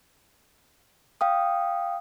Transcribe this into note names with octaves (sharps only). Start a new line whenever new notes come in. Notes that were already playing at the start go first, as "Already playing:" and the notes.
F5 G5 D#6